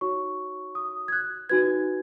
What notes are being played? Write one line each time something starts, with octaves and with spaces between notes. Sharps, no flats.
D#4 F#4 C#5 C#6
D#6
G#6
F#6
D#4 F#4 B4 G#6